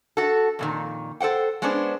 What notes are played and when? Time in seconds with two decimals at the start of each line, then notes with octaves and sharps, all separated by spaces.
0.17 F#4 A4
0.59 F2 A#2 D#3
1.20 A4 C5 F#5 G5
1.62 G#3 B3 C#4 D4 C5